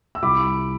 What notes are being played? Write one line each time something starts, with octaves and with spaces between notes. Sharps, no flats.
E6
C2 B5 D6